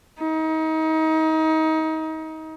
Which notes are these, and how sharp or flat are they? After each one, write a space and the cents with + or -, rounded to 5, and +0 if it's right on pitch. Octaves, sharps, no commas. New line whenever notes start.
D#4 +30